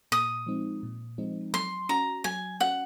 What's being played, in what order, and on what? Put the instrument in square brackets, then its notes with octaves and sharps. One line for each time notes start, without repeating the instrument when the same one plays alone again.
[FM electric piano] A#2 [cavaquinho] D#6
[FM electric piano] F3 G#3 C4 D#4
A#2
F3 G#3 C4 D#4
[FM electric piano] F#3 [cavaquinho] C6
[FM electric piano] C#4 F#4 [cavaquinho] A#5
[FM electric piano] F#3 [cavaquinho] G#5
[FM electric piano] C#4 F#4 [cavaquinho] F#5